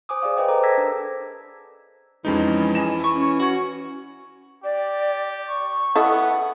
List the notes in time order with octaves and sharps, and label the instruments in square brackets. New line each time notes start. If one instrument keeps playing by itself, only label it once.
[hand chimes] C5 G#5 D6 D#6
G#4 D5 F5
G#4 B4 C5 D#5 G5
A4 B4 C5 A#5 D6
A5 E6 G#6 A#6 B6
D4 A#4
[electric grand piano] F2 G#3 D#4 [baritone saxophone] E3 [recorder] C#4
[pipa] D#4 G#4 [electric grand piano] E7
[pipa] E4 C#6
[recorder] C#4
[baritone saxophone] F#4 [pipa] C#5 C#6
[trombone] G4 [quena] D5
[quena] C#6
[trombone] B3 [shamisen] E4 A4 D#5 [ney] F#5